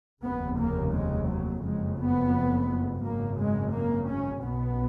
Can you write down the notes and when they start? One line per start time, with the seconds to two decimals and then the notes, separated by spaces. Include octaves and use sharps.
0.23 F1 D#2 C#3 B3
0.58 A#3
0.93 G#3
1.28 F#3
1.63 F#1 F2 C#3 G#3
1.99 B3
3.03 G#1 F#2 C#3 A#3
3.38 G#3
3.73 A#3
4.08 C#4
4.43 B1 B2 B3